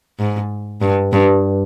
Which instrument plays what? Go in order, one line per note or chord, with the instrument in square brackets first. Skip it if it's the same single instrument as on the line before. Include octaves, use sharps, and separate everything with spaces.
[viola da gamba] G#2
G2
G2